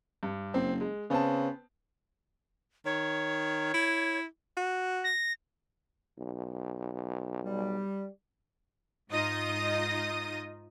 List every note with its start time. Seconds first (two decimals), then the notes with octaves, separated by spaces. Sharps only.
0.23 G2
0.54 F#1 C4
0.81 G#3
1.10 C#3 B3 C4 A5
2.85 D#3 C#5
3.74 E4
4.57 F#4
5.04 A#6
6.19 B1
7.44 G3
9.11 G#2 D#4 F4 D#5 D#6 A#6